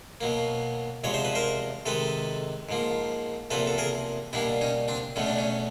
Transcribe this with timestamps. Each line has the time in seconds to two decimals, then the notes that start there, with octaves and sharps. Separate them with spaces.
0.21 B2 F#3 A#3
1.04 E2 C3 F3 G#3 C#5
1.14 C5
1.25 B4
1.35 A#4 C5
1.86 C3 D#3 G#3 A4 B4
2.69 G#2 F3 A#3
3.50 E2 C3 F3 A#3 A4 B4
3.67 A4
3.78 G#4 A#4
4.33 B2 G3 A#3 D4 E4
4.61 C#4 D#4
4.88 C4 D4
5.16 E2 B2 F#3 A3 C#4
5.27 D4
5.38 C#4